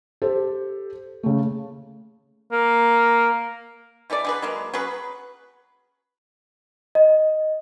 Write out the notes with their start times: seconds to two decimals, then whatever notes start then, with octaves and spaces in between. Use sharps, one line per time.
0.22 G4 A4 C5
1.23 C#3 A3
2.52 A#3
4.10 B2 E3 A4 D5
4.25 D3 G#4 B4
4.42 F#3 G#3 A#3
4.74 F#3 C#4 G#4 B4
6.95 D#5